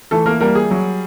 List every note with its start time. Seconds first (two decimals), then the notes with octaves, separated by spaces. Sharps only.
0.11 E3 A3 A4
0.26 A#3 A#4
0.40 G3 A#3 A#4
0.55 G#4
0.71 F#3